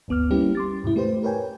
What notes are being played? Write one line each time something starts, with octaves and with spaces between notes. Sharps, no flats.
G1 D2 B3 D6 F6
G3 A#3 C#4 E4 G4 B4
C6 D6 A6
E2 G#2 C3 E4
A3 G4 B4 C5
A#4 B4 C#5 G5 G#5